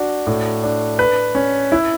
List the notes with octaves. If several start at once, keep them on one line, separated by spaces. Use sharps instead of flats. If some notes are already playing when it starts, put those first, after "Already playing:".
Already playing: D4 F#4
A2
D4
B4
C#4
E4